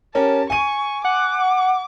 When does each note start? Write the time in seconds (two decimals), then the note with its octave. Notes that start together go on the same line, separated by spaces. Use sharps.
0.15 C#4 G4 A#4 A5
0.50 G#5 C#6 D#7
1.04 F#5 D6